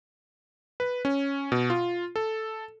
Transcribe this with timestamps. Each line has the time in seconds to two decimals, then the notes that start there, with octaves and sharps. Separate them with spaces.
0.80 B4
1.05 C#4
1.52 B2
1.70 F4
2.16 A4